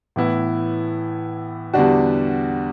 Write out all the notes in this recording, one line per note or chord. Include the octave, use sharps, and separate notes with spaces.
A2 E3 B3 E4
E2 D3 G3 D4 F#4